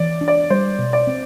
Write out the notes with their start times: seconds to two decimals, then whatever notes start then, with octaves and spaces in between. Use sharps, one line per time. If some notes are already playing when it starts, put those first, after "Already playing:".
Already playing: E3 D5
0.21 D4
0.28 D5
0.50 G3 C5
0.79 B2
0.93 D5
1.07 C4